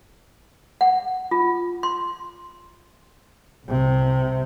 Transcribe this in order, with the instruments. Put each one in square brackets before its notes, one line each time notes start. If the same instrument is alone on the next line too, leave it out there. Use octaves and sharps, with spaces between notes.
[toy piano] F#5
F4
C6
[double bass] C2 C3